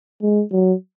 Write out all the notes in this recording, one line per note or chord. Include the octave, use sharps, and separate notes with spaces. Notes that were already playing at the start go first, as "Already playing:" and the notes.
G#3
F#3